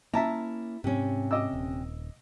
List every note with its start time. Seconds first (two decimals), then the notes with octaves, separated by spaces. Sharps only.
0.14 A#3 C#4 E4 E5 A5 A#5
0.84 G#2 C3 C#4
1.31 D#5 D6 E6
1.53 D#1